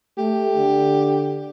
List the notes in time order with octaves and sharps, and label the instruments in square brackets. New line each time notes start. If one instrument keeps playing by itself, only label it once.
[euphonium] A3 [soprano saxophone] G4
[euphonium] D3